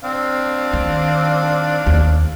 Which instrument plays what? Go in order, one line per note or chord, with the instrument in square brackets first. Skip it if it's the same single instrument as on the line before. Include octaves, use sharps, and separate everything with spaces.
[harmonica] C4 D4 F5
[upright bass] D#3
D#2